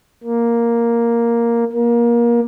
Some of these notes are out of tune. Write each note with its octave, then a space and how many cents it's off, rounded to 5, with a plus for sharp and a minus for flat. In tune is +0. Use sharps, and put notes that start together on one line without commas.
A#3 +5
A#3 +25